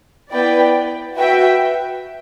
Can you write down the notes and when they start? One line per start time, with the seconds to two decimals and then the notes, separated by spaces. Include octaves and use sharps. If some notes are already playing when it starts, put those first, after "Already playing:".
0.30 B3 E4 B4 D5 G5
1.15 F#4 B4 E5 G5